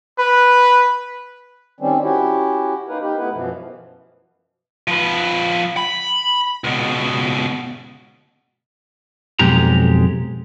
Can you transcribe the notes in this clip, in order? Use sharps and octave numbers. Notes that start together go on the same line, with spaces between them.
B4
D#3 G3 C4 C#4
C#4 E4 F#4 G4
A#3 D#4 A#4 B4
D#4 G4
A3 B3 E4 B4
F#2 B2 E3 F3
F3 B4
B5
C#2 B2
B1 F2 G#3 G4 A#5